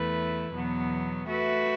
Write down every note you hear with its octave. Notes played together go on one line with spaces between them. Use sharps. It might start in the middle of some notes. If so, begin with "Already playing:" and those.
Already playing: E2 E3 A3 E4 B4
E2 B2 F#3 B3
A3 F#4 B4 E5